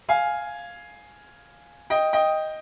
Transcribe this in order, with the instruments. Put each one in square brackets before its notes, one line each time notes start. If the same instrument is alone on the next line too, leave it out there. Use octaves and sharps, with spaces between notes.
[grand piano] F5 G#5
D#5 G5
D#5 G5